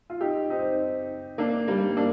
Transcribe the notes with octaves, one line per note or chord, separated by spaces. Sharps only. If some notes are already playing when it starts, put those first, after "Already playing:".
F4
D#4 G4
C4 D#4
A#3 D4
G3 A#3
A#3 D4